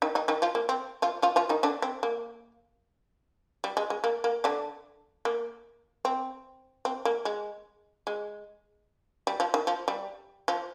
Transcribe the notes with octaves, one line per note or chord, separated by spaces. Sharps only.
D#3 D#4
D#3 D#4
D#3 D#4
F3 F4
A#3
C4
F3 F4
F3 F4
F3 F4
D#3 D#4
D3 D4
C4
A#3
G3
G#3
G#3
A#3
A#3
D3 D4
A#3
C4
C4
A#3
G#3
G#3
G3
F3
D#3
F3
G3
F3